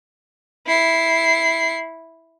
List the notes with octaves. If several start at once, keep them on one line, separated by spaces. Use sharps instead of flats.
E4 C7